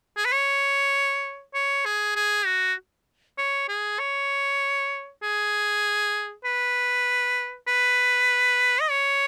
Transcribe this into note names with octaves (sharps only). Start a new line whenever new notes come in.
G#4
B4
C#5
C#5
G#4
G#4
F#4
C#5
G#4
C#5
G#4
B4
B4
D#5
C#5